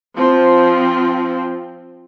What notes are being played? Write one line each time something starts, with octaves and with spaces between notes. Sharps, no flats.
F3 C4 F4